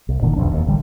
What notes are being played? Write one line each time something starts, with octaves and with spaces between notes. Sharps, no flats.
C2
G1 A#2 D3 D#3
D#1 B1 F2 D4
E1 D#2
A1 D3 G3